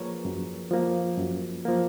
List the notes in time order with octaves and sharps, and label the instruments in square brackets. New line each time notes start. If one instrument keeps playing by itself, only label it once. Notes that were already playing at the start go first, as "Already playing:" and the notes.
Already playing: [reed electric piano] F3 A#3 G#4 A#4 B4 C#5
F#2
F3 A#3
F#2
F3 A#3